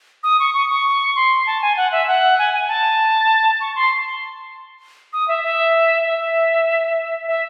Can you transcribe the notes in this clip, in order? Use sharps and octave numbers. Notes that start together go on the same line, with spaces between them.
D#6
C#6
C#6
C#6
C6
A5
G#5
F#5
E5
F#5
G#5
G#5
A5
C#6
C6
D#6
E5
E5
E5
E5